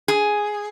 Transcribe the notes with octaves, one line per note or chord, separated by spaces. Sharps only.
G#4